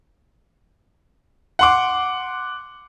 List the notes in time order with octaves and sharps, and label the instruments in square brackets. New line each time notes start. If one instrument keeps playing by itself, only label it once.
[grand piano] F#5 C6 D6